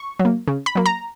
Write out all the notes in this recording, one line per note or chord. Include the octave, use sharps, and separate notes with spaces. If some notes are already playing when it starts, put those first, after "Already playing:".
Already playing: C#6
F#3
A#3
C#3
B5
F#3 A#3
A#5